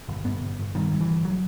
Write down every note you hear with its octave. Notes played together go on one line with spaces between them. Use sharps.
G1
G2 B3
G1
G1
G2 D#3
G2
E3
G1
F#3